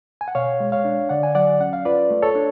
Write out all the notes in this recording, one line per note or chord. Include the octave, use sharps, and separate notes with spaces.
G#5
F#5
B2 C#5 F5
G#3
C#5 F5
D4
D3 D5 F#5
G#5
F#3 D5 F#5
C#4 F#5
F5
F4 B4 D5
A3
A4 C#5
D4